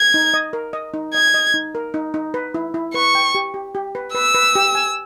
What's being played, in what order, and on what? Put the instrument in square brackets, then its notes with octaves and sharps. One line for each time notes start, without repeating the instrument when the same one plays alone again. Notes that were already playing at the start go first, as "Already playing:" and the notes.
Already playing: [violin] G#6
[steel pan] D#4
D#5
A#4
D#5
D#4
[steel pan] D#5 [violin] G#6
[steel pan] D#5
D#4
A#4
D#4
D#4
B4
E4
E4
[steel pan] B4 [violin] C#6
[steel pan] G5
G4
G4
G4
B4
[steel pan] B4 [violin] E6
[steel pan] B4
G4
G#5